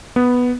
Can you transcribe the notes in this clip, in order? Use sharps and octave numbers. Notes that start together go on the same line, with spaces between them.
B3